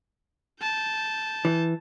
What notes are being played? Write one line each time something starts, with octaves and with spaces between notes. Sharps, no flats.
A5 G6
E3